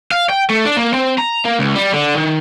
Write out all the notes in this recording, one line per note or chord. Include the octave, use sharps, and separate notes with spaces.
F5
G5
A3
D4
A#3
C4
A#5
A#3
C#2
G3
D3
D#3